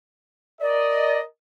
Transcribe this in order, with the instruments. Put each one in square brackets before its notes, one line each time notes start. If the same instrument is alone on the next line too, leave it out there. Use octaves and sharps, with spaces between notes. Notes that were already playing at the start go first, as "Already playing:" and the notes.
[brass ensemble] A#4 D#5 [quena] D5